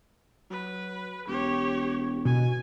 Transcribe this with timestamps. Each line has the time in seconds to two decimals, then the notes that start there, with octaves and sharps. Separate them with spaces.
0.51 F#3 B4
1.27 E1 G4 C#5
2.25 B2 G#5